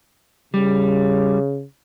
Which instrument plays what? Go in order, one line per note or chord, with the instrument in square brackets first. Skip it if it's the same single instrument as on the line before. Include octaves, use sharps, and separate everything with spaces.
[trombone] C#3 [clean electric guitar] G3